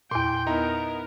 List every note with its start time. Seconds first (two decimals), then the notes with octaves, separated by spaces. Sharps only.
0.11 E2 A#2 G5 C6
0.47 B3 D#4 E4 A#4 A#5